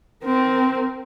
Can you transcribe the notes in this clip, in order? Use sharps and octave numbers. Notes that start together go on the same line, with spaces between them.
C4 A#4